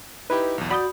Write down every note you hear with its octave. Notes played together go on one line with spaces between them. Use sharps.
D#4 E4 G4 B4
B1 E2
F#4 D5 B5 D#6 G6